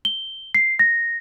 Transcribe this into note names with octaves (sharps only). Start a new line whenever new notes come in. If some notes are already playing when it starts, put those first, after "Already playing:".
G7
C7
A#6